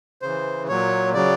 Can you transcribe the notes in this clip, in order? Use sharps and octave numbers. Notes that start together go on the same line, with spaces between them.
C#3 E3 C5
A#2 F#3 C#5
C#3 F#3 D5